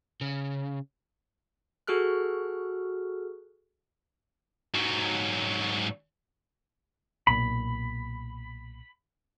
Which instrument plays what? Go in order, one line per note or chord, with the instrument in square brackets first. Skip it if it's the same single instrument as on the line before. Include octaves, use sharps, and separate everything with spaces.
[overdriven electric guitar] C#3
[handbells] F#4 G#4 A4 F6 F#6
[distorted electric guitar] G#2 F#3
[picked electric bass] B1 A#2 [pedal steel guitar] B5